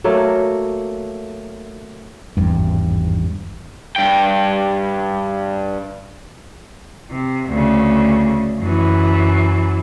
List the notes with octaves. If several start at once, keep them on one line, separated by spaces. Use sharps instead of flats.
F#3 A3 A#3
G#1 E2 G2
G2 G5
C3
D2 C#3
F#2 E3